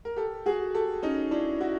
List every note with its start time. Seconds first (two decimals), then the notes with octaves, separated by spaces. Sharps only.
0.05 A#4
0.16 G4 A4
0.46 F#4 G#4
0.74 G4 A4
1.03 C#4 D#4
1.31 D4 E4
1.60 E4 F#4